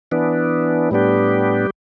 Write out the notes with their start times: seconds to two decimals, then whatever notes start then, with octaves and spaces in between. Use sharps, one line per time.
0.12 E3 B3 D4
0.91 A2 G3 B3 D4 G4